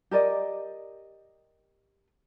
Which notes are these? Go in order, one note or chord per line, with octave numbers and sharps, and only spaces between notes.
G4 A#4 D5 D#5